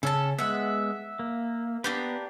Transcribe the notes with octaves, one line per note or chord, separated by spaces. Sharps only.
C#3 C#4 A4 A5
G#3 B3 E5 F#5
A#3
A#3 B3 D4 G4 B4